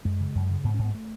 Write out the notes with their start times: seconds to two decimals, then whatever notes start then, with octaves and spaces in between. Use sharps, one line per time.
0.05 F#2 G#3
0.21 C#3
0.35 F#2
0.50 C#3
0.64 G#2 B3
0.74 C#4
0.79 G#2
0.84 B3
0.95 A3